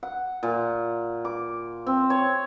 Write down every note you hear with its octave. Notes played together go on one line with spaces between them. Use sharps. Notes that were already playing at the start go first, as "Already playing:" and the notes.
F#5
A#2
D6
C4
C#5